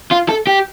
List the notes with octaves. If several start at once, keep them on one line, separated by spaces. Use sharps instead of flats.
F4
A4
G4